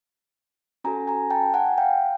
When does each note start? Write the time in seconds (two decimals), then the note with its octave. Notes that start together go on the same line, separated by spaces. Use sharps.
0.84 C#4 F#4 A4 G#5 A#5
1.07 G#5 A#5
1.30 G5 A5
1.54 F#5 G#5
1.78 F5 G5